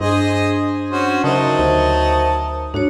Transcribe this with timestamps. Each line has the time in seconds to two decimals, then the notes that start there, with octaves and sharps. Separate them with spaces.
0.01 G2 D4 G#4 C5 D#5
0.90 C#4 F#4 C5
1.24 C#3 F#3 D#4 A#4 C5 E5 A5
1.59 D2
2.74 G#2 D4 F#4 C#5